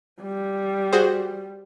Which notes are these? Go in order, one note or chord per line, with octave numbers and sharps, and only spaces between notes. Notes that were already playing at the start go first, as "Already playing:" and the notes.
G3
F#4 G#4 C5